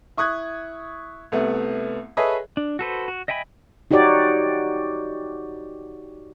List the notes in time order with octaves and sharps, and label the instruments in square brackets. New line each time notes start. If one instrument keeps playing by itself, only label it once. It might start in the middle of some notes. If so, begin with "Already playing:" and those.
[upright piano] E4 C#6 D#6 F#6 G#6
C2 A3 B3
G#4 A4 B4 C#5 D#5 E5
[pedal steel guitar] D4
F#4 A4 B4 C5
F#4
D#5 E5 G5 G#5 B5
[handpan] D#4 F#4 G4 C#5 D5